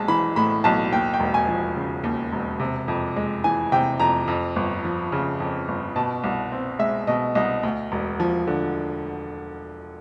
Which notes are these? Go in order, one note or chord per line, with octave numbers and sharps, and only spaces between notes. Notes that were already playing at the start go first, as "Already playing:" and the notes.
Already playing: B1 G#3 A5
E3 B5
A2 B5
B1 A5
D#2 G5
G5
E1
G#5
F3
C#3
D#2
E1
C3
F2
G#3
E3 G#5
C3 G5
F2 A#5
F2
G1
F3
C#3
F2
G1
B2 A5
C2
C4
G#3 E5
B2 D#5
C2 D#5
D2
E1
F3
D3